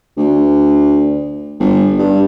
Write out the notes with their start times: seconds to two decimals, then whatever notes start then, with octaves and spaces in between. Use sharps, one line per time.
0.17 D2
1.60 G1
1.99 G2